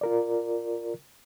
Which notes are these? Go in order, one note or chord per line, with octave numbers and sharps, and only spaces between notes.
F4 A#4 D5